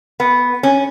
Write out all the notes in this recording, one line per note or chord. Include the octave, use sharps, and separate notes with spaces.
B3
C#4